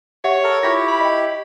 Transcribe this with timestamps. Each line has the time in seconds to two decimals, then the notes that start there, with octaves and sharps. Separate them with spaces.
0.24 G4 C#5 E5 F#5
0.44 A4 A#4
0.63 E4 F4 G4 C#6 A#6
0.88 B5
1.01 D#5 G5